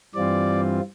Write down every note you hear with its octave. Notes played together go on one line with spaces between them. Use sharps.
G2 E3 G3 C4 F4 D5